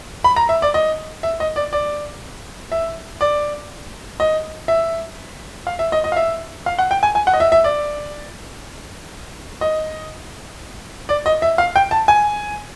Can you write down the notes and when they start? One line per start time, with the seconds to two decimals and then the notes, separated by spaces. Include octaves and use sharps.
0.24 B5
0.36 A#5
0.49 E5
0.62 D5
0.74 D#5
1.23 E5
1.40 D#5
1.56 D5
1.73 D5
2.72 E5
3.21 D5
4.20 D#5
4.68 E5
5.67 F5
5.79 E5
5.92 D#5
6.04 D#5
6.12 F5
6.16 E5
6.66 F5
6.79 F#5
6.91 G5
7.03 G#5
7.15 G#5
7.27 F#5
7.33 D#5
7.40 E5
7.52 E5
7.64 D5
9.61 D#5
11.09 D5
11.26 D#5
11.42 E5
11.58 F5
11.76 G5
11.91 A5
12.08 G#5